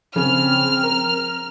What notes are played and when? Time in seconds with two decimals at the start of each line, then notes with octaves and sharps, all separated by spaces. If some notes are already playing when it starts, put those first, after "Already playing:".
0.16 C#3 F3 C4 F6
0.83 A#4